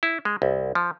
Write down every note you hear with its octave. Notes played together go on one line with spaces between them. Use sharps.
E4
G#3
C2
F3